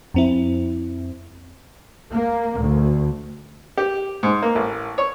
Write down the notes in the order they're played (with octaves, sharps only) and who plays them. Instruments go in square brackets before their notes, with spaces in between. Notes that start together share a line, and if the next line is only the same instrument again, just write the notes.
[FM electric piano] F2 C4 E4
[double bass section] A#3
D2
[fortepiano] G4
G#2
A#3
A1
C#5